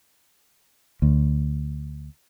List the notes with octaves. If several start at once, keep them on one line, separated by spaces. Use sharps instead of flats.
D2